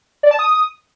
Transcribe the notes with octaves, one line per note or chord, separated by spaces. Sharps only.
D5
A5
D#6